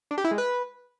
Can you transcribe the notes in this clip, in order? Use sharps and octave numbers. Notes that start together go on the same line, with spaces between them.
D4
G4
E4
G#3
B4